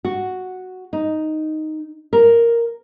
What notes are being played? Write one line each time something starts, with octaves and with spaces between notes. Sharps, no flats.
F#4
D#4
A#4